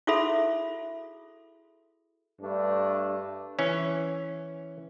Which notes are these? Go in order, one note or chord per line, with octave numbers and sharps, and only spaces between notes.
E4 F#4 G#4 A4 E5 B5
G2 A3 D4
E3 C#4